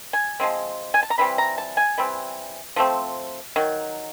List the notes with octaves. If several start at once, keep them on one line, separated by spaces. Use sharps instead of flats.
G#5
F3 G#3 C4
G#5
A5
A#5
E3 G3 C4 B5
A#5
A5
G#5
E3 G3 C4
F3 A3 C4
D#3 F#3